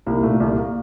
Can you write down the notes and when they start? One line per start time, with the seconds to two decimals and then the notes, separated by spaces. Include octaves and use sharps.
0.06 C2 A#3
0.23 A#2 A3
0.40 C2 A#3
0.58 A#3